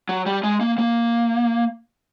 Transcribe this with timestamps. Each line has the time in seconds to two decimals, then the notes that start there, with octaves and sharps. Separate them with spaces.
0.09 F#3
0.26 G3
0.43 G#3
0.61 A#3
0.78 A#3